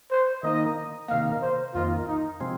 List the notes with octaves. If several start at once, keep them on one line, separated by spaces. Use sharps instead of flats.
C5
D#3 A#3 D#4 D#5
C3 D#3 A#3 F5
C5
F2 D#3 A#3 F4
D#4
C3 F3 G#3 C4